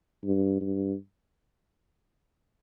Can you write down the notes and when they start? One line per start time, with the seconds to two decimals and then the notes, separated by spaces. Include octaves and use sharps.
0.24 G2
0.61 G2